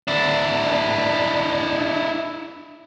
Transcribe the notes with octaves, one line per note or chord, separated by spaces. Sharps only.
D4 E4